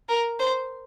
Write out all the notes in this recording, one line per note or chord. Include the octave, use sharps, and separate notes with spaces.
A#4
C5